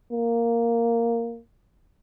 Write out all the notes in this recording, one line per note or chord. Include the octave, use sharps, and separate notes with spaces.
A#3